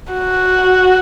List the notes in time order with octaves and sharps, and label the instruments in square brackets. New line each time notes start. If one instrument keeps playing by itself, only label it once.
[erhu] F#4